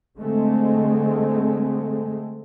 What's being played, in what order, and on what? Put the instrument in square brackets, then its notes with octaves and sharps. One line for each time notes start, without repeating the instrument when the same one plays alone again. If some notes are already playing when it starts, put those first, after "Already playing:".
[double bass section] D3 G#3 A3 C4